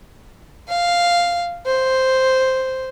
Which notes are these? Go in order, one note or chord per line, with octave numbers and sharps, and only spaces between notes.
F5
C5